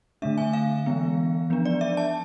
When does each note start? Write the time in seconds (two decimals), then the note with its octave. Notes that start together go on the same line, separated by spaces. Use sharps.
0.22 D3 A3 D4 E5
0.38 G#5
0.53 F5
0.86 E3 G#3 B3
1.50 F3 B3 D4
1.65 D5
1.81 E5
1.97 A5